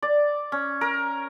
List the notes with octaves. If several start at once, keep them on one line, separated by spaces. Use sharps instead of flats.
D5
C#4
A#4